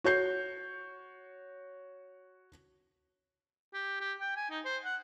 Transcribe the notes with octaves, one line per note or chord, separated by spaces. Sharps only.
F#4 C#5 G6 C7
G4
G4
G5
G#5
D#4
C5
F#5